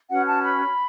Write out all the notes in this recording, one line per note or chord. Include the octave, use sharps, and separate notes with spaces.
C#4 F#4 B4 F#5
A5
B5